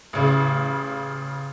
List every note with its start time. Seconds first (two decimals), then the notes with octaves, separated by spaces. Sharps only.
0.13 A1 C#3